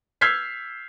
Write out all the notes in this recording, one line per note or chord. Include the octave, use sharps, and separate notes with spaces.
E6 F6 G6 G#6 B6 C7